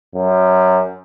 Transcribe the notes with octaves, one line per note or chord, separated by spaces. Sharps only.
F#2